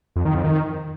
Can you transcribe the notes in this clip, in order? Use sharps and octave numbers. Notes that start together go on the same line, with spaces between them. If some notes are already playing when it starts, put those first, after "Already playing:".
F2
D#3
F2
D#3